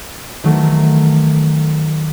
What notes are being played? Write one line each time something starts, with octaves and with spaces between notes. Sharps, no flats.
D#3 E3 F#3 A3